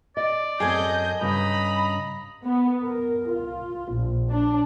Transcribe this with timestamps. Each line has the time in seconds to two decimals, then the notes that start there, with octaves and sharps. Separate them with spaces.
0.17 D5 D#5
0.60 F#2 C4 G#4 A4 D#5 G#5 G6
1.21 G2 C#3 D#5 A#5 B5
2.44 B3
2.85 A#4
3.31 F4
3.92 A#1
4.31 D4